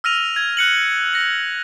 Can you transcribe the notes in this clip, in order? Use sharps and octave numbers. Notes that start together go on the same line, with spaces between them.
E6 F6 A#6 D#7 F7
G#6
F#6 C#7 F#7
A#6 C#7